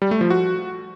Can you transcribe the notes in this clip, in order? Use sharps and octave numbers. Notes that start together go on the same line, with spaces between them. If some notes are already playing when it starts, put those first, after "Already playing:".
G3
A3
F3
F#4